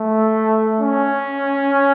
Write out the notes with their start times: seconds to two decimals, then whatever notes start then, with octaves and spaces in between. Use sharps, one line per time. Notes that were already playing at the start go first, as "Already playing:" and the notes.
Already playing: A3
0.81 C#4